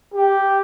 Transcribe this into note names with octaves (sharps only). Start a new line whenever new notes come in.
G4